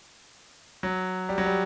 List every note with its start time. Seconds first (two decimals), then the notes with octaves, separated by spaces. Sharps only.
0.83 F#3
1.29 G3
1.38 F#3
1.46 G3